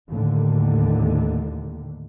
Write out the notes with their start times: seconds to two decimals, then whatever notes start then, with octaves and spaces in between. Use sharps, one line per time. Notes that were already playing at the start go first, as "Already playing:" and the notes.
0.11 D#2 A2 D3